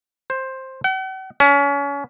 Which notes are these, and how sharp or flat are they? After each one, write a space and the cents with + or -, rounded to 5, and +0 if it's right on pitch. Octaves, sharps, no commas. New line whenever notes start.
C5 +10
F#5 +45
C#4 +30